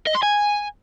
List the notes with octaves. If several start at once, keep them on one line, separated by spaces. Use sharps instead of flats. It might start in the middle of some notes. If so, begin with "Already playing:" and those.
D#5
C6
G#5